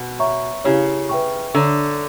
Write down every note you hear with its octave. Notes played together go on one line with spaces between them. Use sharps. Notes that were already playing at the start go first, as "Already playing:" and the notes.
Already playing: B2
C#5 E5 A#5 C#6
C#3 E4 G4 C#5
B4 E5 G5 C#6
D3 C#5 E5 A#5 C#6